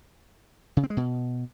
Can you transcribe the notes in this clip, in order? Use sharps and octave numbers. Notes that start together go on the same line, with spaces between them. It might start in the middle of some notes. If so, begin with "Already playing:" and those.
C#3
C4
G#3
B2